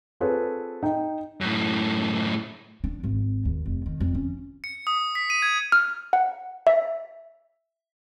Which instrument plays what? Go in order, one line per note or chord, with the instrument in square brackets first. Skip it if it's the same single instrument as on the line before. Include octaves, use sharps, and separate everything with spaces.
[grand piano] C4 F4 G#4 A4 B4 C#5
D#4 G5
[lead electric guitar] F#2 A2
[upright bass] D4
G#1
D#2
F1
D#3
F2
C#4
[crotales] C#7
D#6
B6
D#7
G#6
[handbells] F6
F#5
E5